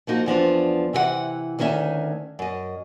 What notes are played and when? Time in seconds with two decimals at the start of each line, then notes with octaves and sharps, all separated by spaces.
0.07 F3 A#3 D#4 F#4
0.26 E2 F3 B3 D4
0.93 C3 E3 C5 F#5
1.59 D2 D#3 C#4 A#4 E5
2.39 F#2 D#5